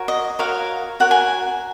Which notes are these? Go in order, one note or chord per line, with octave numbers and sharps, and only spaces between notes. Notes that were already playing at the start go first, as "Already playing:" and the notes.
Already playing: F#4 A#4 C#5
D#5
F#4 A#4 C#5 F5
F#4 A#4 C#5 F#5
G#5